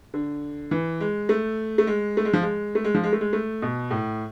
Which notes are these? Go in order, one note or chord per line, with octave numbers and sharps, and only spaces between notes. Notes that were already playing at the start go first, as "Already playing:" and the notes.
D3
E3
G#3
A3
A3
G#3
A3
G#3
F3
G#3
A3
G#3
F3
G#3
A3
G#3
A3
B2
A2